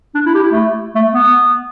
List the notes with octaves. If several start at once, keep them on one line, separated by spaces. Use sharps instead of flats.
D4
E4
G4
E4
A3
A3
B3